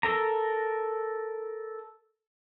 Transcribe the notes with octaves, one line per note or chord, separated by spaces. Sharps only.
A4 A#4 A#5